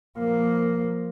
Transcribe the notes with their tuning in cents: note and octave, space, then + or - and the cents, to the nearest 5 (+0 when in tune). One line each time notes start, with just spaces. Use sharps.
F3 +5 A#3 +0